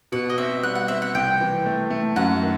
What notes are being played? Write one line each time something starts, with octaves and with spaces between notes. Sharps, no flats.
B2 F#5
D#5
C4 E5
G3 F#5
F#5
C4 E5
F#5
C2 G5
E3
A3
A3
F#2 F#5
D#3